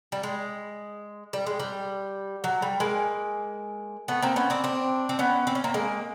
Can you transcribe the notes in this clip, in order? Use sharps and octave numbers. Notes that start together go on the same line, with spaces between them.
G3
G#3
G3
G#3
G3
F#3
G3
G#3 A#3
A3 B3
A#3 C4
B3 C#4
C4 D4
C4 D4
C4
B3 C#4
C4
C#4
A#3 C4
G#3 A#3